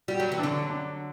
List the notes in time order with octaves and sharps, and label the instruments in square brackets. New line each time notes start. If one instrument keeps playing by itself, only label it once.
[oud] G3 [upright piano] F#4
[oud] F#3
E3
[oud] D3 F#3 [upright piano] D4
[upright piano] D4